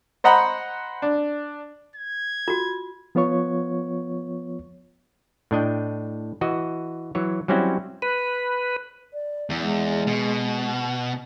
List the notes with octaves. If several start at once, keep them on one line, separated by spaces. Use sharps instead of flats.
C5 D#5 F#5 A#5 B5
D4
G#6
F4 F#4
F3 B3 F4 C#5 C#6
A2 D4 D#5 G5
E3 F#4 D#5
E3 F#3 C#5
F#3 G3 C4 C#4 E4 F#4
B4
D5
E2
G#3
B2